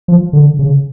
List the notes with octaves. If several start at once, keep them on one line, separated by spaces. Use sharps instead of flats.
F3
D3
C#3